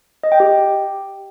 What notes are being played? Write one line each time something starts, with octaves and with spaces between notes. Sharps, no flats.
D#5
G5
G4